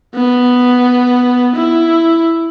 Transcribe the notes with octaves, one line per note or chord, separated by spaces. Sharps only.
B3
E4